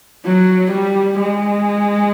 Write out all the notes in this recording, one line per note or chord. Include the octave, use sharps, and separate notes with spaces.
F#3
G3
G#3